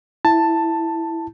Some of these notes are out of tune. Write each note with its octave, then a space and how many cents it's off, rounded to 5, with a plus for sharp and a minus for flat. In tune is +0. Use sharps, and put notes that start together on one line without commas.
E4 +0 A5 +10